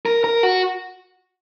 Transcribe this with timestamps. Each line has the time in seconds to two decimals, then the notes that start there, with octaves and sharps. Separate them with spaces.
0.06 A#4
0.24 A#4
0.43 F#4